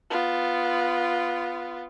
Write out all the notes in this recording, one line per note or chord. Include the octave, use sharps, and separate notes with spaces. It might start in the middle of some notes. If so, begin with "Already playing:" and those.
B3 F4